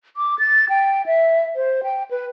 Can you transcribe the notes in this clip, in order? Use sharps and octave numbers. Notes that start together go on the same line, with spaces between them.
D6
A6
G5
E5
C5
G5
B4